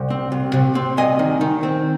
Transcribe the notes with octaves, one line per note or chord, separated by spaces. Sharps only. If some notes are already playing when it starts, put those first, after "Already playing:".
Already playing: C2 C5
C4
C2
C3
C4
C2 D#5 G#5
D#3
D#3
C4